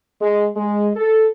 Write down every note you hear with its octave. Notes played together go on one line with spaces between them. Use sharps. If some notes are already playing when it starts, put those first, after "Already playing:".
G#3
G#3
A4